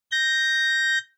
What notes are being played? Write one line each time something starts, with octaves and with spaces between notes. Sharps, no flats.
G6 A#6